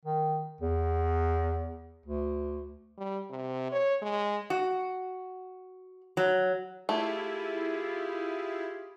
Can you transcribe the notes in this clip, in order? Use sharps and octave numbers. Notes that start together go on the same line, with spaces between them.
D#3
E2
D2
G3
C3
C#5
G#3
F#4
F#3
A3 E4 F4 G4 G#4